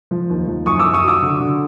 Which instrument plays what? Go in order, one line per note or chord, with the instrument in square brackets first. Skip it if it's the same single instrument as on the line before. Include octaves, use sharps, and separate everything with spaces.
[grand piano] F3
D#2
F3
F#2 C#6 D#6
D6 E6
F#2
C#6 D#6
F#3 D6 E6
D3
D3